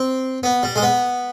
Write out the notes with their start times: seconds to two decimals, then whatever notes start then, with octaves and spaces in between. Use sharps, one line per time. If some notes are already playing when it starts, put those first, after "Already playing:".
Already playing: C4
0.43 B3
0.63 G3
0.76 G#3
0.83 B3